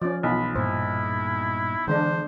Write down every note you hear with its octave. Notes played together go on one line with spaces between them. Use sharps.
F3 C#4 D5
B1 E3 F4 B5
G2 A#2 E4 C5
D3 E3 G#3 D4 C5